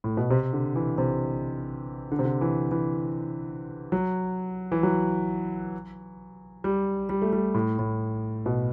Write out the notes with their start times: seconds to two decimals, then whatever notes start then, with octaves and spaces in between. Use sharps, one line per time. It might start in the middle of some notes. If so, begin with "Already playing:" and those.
0.04 A2
0.17 B2
0.30 C3
0.53 D3
0.76 E3
0.98 C3
2.12 D3
2.19 C3
2.25 D3
2.41 E3
2.71 E3
3.92 F#3
4.72 E3
4.83 F#3
6.64 G3
7.09 G3
7.22 A3
7.33 G3
7.54 A2
7.79 A2
8.46 B2